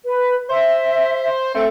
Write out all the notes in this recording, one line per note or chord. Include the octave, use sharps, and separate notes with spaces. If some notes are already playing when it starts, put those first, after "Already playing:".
B4
C5 E5
A3 C4